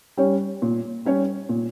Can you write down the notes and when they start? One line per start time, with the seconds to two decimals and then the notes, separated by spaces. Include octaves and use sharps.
0.17 G3 C#4 G4 C#5
0.62 A#2
1.05 G3 C#4 G4 C#5
1.49 A#2